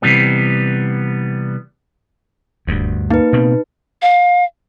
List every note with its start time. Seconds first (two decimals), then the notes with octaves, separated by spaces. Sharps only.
0.02 C3 E3 G3 B3
2.67 D#1 D2 G2
3.10 A#3 D#4 B4
3.33 B2 C4
4.02 F5